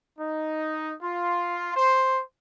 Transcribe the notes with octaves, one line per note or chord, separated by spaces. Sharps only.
D#4
F4
C5